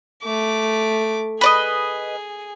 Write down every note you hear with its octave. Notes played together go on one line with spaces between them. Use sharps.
A3 D6
G#4 B4 D5 D#5